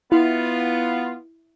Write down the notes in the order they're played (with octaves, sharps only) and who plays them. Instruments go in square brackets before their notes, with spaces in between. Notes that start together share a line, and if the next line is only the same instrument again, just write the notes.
[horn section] B3 F4 [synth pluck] E4